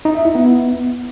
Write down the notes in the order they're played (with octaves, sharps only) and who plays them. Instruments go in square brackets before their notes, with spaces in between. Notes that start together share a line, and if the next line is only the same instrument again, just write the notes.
[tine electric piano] D#4
E5
E4
B3